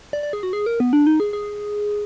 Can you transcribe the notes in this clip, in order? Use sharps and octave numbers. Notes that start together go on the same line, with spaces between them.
D5
D5
G#4
F#4
G#4
A#4
B3
D4
D#4
G#4
G#4